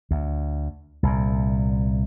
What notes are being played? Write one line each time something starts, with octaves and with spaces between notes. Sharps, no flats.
D2
C2 A#2